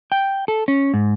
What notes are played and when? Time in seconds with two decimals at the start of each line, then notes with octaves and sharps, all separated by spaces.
0.12 G5
0.48 A4
0.68 C#4
0.94 G#2